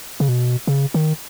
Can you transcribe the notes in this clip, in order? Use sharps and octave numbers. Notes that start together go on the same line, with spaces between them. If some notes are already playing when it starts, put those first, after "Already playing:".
C#3
B2
C#3
D#3